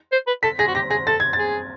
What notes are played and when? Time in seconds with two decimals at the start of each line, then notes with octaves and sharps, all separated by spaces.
0.12 C5
0.27 B4
0.43 A4 B6
0.59 G#4 A#6
0.68 F#4
0.75 G4 A#6
0.90 G#4 A#6
1.07 A4 A6
1.20 G#6
1.33 A6
1.38 G#4